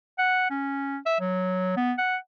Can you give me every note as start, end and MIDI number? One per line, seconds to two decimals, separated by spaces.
0.18 0.48 78
0.50 0.98 61
1.06 1.17 76
1.20 1.72 54
1.77 1.93 59
1.98 2.17 78